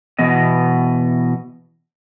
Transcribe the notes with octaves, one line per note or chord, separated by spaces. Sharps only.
B2 E3 B3 D#5